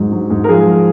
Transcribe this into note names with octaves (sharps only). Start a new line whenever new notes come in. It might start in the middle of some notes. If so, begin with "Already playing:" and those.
Already playing: G#2 F#3
F#3
G#2
A#4
F3 G#4